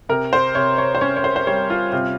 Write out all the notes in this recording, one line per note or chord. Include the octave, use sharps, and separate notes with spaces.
C3 A#4
C5
C3 C#5
C#5
C5
C#4 C#5
C#5
C5
C5
G3 C#5
F4
C3 F4